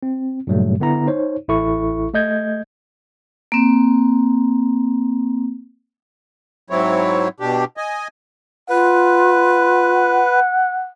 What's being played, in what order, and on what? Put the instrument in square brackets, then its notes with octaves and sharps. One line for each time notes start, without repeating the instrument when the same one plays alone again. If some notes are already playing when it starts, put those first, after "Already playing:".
[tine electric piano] C4
G2 A#2 C#3 F#3 G3 A3
D3 B3 E4 A#5
D#4 C5 C#5
A1 E4 A4 C#6
A3 D#5 G6 G#6
[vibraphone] A#3 C4
[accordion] G#2 F#3 C4 E4 C#5
B2 D4 G4
D#5 G#5
[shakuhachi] F4 [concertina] B4 [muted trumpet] F#5